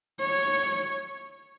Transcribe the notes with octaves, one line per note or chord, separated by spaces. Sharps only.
C#5